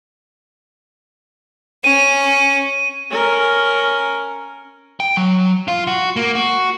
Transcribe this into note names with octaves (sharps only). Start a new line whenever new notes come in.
C#4 D#7
C#4 A#4
G5
F#3
F4
F#4
A#3
F#4